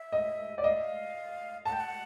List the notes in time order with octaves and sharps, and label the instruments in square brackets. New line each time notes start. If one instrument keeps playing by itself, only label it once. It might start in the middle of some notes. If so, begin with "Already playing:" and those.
Already playing: [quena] E5
[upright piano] D#5
D5
[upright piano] D#5 [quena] F5
[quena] E5
F5
[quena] F#5 [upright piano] A5
[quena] G5
F#5